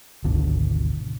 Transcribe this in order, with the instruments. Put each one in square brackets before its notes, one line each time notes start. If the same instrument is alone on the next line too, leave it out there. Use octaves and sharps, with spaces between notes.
[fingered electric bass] G#1 D2 B2 D3